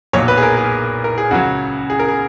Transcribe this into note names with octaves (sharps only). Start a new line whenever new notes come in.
B1 A#2 F#3 C#5
B4
G#4
A#4
G#4
A#4
G#4
C#2 C#3 F#3 F#4
G#4
A#4
G#4